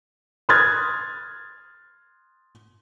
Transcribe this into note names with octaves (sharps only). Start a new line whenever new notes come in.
C6 D#6 F6 F#6 G#6 A6